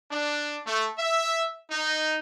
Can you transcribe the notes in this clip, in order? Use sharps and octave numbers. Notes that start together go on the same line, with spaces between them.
D4
A3
E5
D#4